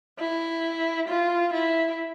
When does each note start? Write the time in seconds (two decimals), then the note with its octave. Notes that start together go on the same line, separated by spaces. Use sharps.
0.19 E4
1.08 F4
1.53 E4